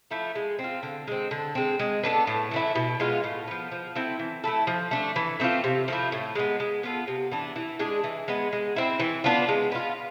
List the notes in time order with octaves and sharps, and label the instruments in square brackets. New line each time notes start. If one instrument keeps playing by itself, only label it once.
[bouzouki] F3 A3 E4
G#3
C4
F4
D3
G#3 C4
D3
G#3 C4
G#3
B3 D4 A4
A2
E3 A3 E4
B2
G#3 B3 F4
A2
F3 B3
F3
A3 C4 E4
E3
A3 E4 A4
F3
A3 D4
E3
A3 C4 F4
C3
F3 A3 E4
A2
G#3 B3
G#3
B3 F4 A4
C3
E3 B3 D4
E3
G#3 D4 G#4
E3
G#3 B3
G#3
C4 E4
E3
B3 D4 F4
G#3
B3 F4